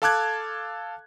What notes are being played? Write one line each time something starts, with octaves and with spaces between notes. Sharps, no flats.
A4 F5 A5 D6 F#6 G#6